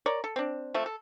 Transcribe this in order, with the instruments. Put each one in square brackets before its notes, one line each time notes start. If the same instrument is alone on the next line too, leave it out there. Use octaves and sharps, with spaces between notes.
[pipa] A#4 C#5 D5
A4
C4 D4
F3 A3 C4
A4